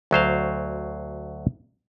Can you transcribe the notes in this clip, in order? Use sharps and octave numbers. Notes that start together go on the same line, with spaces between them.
D2 F#3 C5 F5